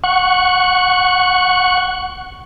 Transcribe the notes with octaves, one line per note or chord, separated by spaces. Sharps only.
F#5 C#6